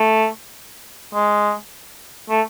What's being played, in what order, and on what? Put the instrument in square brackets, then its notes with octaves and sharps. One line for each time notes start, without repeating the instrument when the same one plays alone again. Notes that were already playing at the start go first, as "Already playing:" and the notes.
Already playing: [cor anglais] A3
G#3
A3